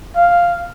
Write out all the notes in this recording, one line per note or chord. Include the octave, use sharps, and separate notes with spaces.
F5